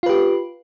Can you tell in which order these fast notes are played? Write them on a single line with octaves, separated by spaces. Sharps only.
F4 B4 G4